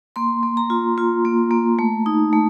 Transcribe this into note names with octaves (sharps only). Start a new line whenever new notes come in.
A#3 C6
A#3
A#5
F4
F4
A#3
A#3
A3
D#4
A3